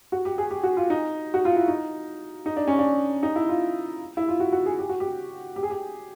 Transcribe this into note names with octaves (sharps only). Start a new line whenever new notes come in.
F#4
G4
G#4
G4
F#4
F4
D#4
F#4
F4
E4
D#4
D#4
D4
C#4
D4
D#4
E4
F4
E4
F4
F#4
F#4
G#4
G4
F#4
G4
G4
G#4
G4